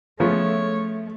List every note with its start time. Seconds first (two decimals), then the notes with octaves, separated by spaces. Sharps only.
0.20 C#3 F3 A3 B3 C#5
0.64 A3